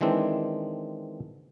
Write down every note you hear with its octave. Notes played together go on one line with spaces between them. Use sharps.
D#3 E3 G#3 C4 D4